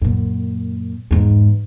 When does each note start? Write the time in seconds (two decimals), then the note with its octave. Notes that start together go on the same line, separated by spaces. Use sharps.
0.02 F#2 A#2
1.11 E2 G#2